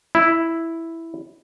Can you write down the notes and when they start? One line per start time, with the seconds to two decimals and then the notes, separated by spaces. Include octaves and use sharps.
0.15 E4